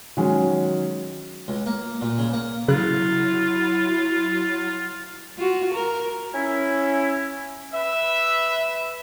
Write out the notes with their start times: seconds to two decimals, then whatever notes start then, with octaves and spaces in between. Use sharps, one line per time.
0.17 D#3 F#3 G#3 C#4
1.48 C#2
1.66 A#3
2.01 A#2
2.18 C#3
2.33 A#3
2.68 C#3 F#3 E4 F4 F#6
5.37 F4 F#4
5.74 A#4
6.34 C#4 E4
7.73 B4 E5